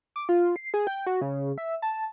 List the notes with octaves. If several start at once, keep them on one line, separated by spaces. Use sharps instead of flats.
D6
F4
C7
G#4
G5
F#4
C#3
E5
A5